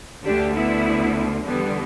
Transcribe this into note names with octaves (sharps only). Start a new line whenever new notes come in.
D2 D3 D4 G4
B3 E4
E2 D3 G3 B3